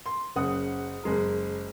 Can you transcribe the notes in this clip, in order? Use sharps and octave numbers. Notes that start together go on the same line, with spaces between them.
C6
F#1 C#3 F#5 D#6
F#1 G#3 A#4